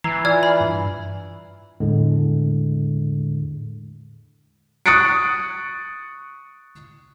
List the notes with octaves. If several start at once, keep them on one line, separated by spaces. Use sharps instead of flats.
E3 A#5 E6 G#6 C7
F4 D5 G#5 F6 G#6
B5
G2
E2 A2 D3 G#3
C#6 D#6 F#6 A6 C#7 D7